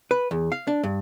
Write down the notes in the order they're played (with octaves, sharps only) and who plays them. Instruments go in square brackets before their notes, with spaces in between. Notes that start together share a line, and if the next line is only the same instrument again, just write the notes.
[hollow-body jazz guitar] B4
E2
F5
D4
G2